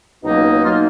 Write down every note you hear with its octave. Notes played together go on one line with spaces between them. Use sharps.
C#2 B2 F#3 A#3 D#4
B2 F#3 A#3 D#4 F4